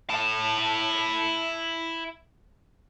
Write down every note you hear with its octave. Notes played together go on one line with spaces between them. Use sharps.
E4 A5